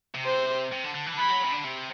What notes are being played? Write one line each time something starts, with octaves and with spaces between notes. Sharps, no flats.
C3
C5
C3
D3
D3
E3
D3
E3 B5
F#3
C3
D3
C3